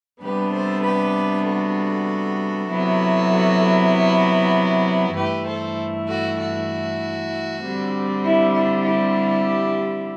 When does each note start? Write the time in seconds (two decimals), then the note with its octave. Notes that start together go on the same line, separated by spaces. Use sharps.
0.22 C3 G3 B3 D4 G4 B4
0.53 A4 C5
0.83 G4 B4
1.46 F#4 A4
2.69 C3 F#3 B3 E4
3.30 F#4 A4
3.61 F#4
5.15 G2 E3 A3 E4 G4 B4
5.46 A4 C5
6.07 F#4 A4
6.39 F#4
7.63 D3 G3 C4
8.24 E4
8.55 E4
8.85 E4 G4